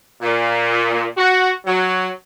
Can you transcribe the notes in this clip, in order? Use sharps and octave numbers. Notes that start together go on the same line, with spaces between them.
A#2
F#4
F#3